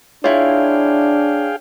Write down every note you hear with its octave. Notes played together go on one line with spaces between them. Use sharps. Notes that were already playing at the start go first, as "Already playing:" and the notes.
D4 E4 F4 G#4 C#5 F5 G5